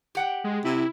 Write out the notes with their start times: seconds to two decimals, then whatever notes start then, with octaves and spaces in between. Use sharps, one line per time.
0.15 G4 F#5 G5
0.44 G#3
0.65 C3 E4